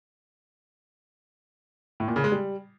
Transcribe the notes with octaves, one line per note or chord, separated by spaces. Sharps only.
A2
A#2
C#3
G#3
G3